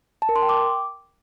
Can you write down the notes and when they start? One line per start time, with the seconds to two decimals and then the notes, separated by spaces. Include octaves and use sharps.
0.22 A5
0.29 A#4
0.36 C6
0.42 G5
0.49 D6